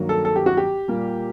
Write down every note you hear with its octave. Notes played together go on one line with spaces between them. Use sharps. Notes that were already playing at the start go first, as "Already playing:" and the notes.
Already playing: G2 D#3 F#3 A#3
A4
A4
G4
F#4
G4
A#2 G3 A#3